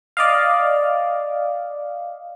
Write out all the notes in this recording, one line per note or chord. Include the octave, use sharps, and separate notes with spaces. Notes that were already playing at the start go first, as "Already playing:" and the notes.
D5 D#5 F5